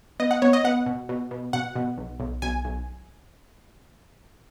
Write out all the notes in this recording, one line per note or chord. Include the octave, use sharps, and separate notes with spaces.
B3 D#5
F#5
B3 C#5
D#5
B3 F#5
B2
B2
B2
B2 F#5
B2
B1
B1
B1 G#5
B1